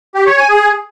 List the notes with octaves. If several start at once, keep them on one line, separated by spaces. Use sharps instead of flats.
G4
C#5
G#5
G#4